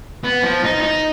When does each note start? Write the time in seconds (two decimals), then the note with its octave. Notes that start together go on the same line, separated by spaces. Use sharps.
0.24 B3
0.43 F3
0.64 D#4
0.81 D#4